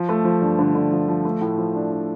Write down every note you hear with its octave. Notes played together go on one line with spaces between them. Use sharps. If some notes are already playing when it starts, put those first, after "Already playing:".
Already playing: F3
A3
F3
G2
D3
D3
F3
F3
A3
A2
F3
D4
D4